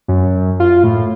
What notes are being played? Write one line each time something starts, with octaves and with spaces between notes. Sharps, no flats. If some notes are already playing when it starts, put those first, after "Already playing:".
F#2
F4
A2